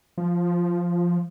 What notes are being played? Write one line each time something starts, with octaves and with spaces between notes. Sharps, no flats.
F3